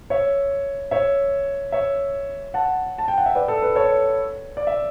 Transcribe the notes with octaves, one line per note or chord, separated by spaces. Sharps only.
C#5 E5
C#5 E5
C#5 E5
F#5 A5
A5
G5
F#5
E5
B4 D5
A4
B4
A4 C#5
D5
E5